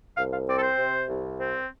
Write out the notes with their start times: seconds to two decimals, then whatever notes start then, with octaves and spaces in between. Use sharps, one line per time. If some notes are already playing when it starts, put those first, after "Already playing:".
0.17 C2 F5
0.33 F5
0.48 C4 D5
0.58 A4
0.62 C5
0.78 C3
1.08 C2
1.39 C4